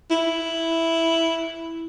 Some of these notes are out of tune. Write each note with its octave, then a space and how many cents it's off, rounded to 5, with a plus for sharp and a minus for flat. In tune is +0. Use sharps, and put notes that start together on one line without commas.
E4 +0